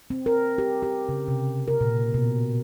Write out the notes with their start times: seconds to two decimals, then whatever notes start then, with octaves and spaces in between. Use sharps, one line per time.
0.10 C4
0.26 A#4
0.58 G4
0.82 G4
1.09 C#3
1.28 C3
1.68 A#4
1.81 A#2
2.14 B2